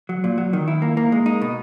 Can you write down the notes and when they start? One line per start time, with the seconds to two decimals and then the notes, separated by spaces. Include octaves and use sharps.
0.09 F#3
0.24 A#2
0.38 F#3
0.53 D#3
0.68 E4
0.82 A#3
0.97 A#3
1.12 G#3
1.26 D#4
1.41 B2